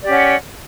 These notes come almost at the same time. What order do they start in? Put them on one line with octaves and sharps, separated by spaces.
D5 G4 C#4 F#5